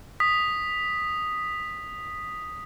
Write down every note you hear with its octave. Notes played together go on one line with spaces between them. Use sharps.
D#6 B6